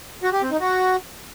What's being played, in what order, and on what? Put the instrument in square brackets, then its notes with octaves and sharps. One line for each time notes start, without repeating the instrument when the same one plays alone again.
[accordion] F#4
G4
C4
D#4
F#4